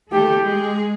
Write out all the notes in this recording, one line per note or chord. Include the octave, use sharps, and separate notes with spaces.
A3 G4 A4
G#3 G#4